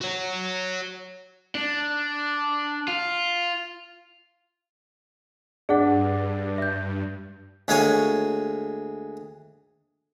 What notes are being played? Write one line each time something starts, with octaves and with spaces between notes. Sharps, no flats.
F#4 C#5
D4
F4
G2 D4 G#4 F#5
E5 G6
D2 G#3 A#3 C#5 G#5